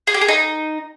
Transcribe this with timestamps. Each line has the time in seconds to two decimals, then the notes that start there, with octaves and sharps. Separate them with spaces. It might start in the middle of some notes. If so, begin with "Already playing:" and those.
0.07 G#4
0.14 G4
0.21 G#4
0.28 D#4